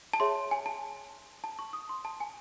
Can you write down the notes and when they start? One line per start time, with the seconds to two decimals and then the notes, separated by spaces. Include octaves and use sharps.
0.13 A5
0.20 G#4 C#5 E5 C6
0.51 G#5
0.66 A5
1.44 A5
1.59 C#6
1.73 D#6
1.89 C6
2.05 A5
2.20 G#5